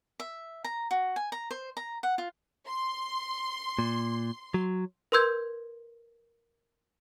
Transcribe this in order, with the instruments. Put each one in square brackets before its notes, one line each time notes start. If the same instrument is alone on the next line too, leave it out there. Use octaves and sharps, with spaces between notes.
[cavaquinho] E5
A#5
F#4
G#5
A#5
C5
A#5
F#5
F4
[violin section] C6
[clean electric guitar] A#2
F#3
[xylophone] A#4 B4 C6 E6 G6 G#6